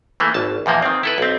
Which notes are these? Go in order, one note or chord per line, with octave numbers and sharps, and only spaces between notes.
E3 A3 A#3
G#1 A5
E2 A#2 F3 A#3
D#3 C4
E4 A4 B4
B1 C4